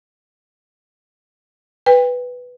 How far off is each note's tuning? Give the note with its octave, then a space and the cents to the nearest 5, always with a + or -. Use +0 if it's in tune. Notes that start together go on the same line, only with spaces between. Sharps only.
B4 +0 G5 +35